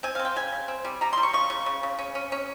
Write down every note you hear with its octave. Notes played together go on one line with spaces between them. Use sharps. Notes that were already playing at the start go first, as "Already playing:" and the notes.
C4 G#5
F5
C4
G5
C#3 G#5
C#3
C4
G3
G3 A#5
G3 C6
C#6
C#3 C#6
C#3
C#3
C#3
C#4
C#4
C#4